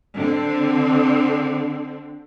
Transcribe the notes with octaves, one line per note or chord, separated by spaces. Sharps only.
D3 C4